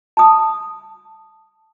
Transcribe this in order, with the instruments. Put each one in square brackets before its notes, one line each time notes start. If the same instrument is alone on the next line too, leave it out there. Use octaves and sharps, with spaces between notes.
[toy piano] A5 D#6